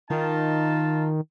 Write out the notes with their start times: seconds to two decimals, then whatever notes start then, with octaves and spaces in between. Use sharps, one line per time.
0.10 D#3 D#4 F4 A5